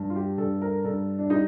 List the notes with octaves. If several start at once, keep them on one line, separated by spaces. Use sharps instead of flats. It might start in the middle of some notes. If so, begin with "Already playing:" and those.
Already playing: G2
F4
G4
G2 A4
A#4
G2 A4
D4
G3 D#4